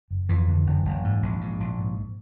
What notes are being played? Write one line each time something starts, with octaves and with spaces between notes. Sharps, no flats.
F#1
F2 E3
D3
F#1
F#1
G#2
A#1
G#2
A#1
G#2